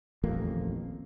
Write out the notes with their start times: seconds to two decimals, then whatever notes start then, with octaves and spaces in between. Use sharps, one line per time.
0.23 D#1 A1 F2 A#3